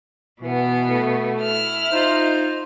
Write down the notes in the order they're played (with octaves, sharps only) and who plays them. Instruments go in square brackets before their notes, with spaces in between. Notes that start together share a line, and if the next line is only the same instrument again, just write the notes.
[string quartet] B2 B3 [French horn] E3
[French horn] A3
[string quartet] E4 F6
[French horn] D#4 [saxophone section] F4 C5